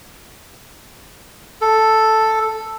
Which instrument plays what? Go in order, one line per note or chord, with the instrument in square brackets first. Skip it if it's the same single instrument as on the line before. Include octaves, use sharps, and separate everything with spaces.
[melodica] A4